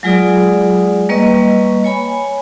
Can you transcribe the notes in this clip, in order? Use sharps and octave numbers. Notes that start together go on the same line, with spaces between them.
F#3 G#3 F4 G#4 D5 D#6
G3 A#3 B4 D#5 C#6
C#5 G#5 B5